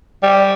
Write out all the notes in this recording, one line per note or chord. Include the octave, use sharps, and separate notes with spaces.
G3